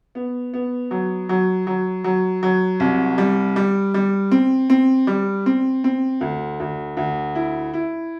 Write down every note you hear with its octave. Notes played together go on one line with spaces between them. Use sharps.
B3
B3
F#3
F#3
F#3
F#3
F#3
C2
G3
G3
G3
C4
C4
G3
C4
C4
D2
D2
D2
E4
E4